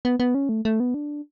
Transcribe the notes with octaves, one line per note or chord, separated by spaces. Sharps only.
B3
B3
C#4
A3
A3
B3
D4